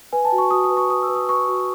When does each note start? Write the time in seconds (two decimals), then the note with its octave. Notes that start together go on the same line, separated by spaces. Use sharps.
0.13 B4 G#5
0.25 A5
0.32 F#4
0.38 C#6
0.51 F#4 D#6
0.64 D#6
0.70 B4
0.77 C#6
0.90 B4 D#6
1.03 E6
1.09 B4
1.15 D#6
1.28 B4 C#6
1.48 F#4